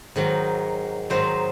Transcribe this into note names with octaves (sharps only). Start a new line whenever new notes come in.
G#2 D#3 F#3
G#2 D#3 F#3 C5